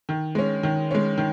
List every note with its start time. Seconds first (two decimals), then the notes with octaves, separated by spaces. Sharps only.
0.09 D#3
0.35 G#3 C#4
0.63 D#3
0.91 G#3 C#4
1.18 D#3